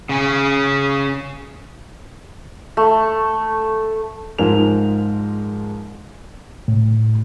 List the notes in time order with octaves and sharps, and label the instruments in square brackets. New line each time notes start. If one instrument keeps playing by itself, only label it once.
[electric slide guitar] C#3 C#4
[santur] A3
[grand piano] G#2 F3 F4 A#4 G#5 F7
[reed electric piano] A2